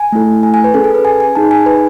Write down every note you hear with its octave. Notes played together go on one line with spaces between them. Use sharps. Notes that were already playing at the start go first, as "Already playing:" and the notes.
Already playing: G#5
A3 E4 A4
G#5
G#5
B4
C#4 G#4 A4
A4
B4
G#5
G#5
D#4 G#4 A5
G#5
B4